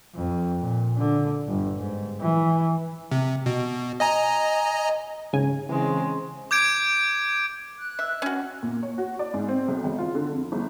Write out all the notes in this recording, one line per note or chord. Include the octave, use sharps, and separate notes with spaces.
F2
A#2
D3
G1
G#2
E3
C3
B2
D#5 G#5 A#5
G#2 C#3 G#5
C#3 E3 G#3 C4
D6 G6 G#6 D7
F#6
E5
C#4 F#4
A#2
C#5
F#4
D5
G#2
C4
B1
G#1
F4
D3
F2
G1